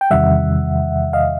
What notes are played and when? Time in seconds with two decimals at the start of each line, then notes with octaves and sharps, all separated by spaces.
0.01 G5
0.11 E2 C3 D#3 G3 E5 F#5
1.13 D#5 F5